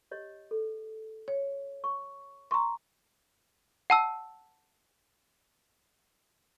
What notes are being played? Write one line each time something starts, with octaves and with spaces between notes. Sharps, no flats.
G4 C#5 D#5
A4
C#5
C#6
G5 A#5 C6 C#6
F#5 A5 E6